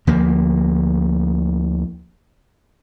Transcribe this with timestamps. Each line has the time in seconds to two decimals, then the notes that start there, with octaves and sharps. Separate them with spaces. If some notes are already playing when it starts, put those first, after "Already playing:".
0.07 D2 F3 A#3